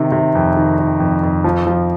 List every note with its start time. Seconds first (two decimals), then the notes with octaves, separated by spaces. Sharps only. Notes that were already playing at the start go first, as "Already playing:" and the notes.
Already playing: C3 D#3
0.12 C3
0.35 F2
0.57 D#3
0.78 D#3
1.00 F2
1.23 F2
1.44 F3
1.67 F3